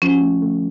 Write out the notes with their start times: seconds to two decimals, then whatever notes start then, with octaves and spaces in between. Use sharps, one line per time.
0.02 F3 C#4
0.22 A3
0.42 A3